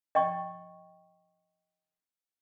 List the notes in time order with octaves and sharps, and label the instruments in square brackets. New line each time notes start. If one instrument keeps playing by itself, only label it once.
[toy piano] D#5 G5 C#6